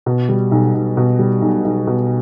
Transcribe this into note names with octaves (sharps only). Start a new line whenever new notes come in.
B2
G3
B1
B1
B2
G3
B1
B1
B2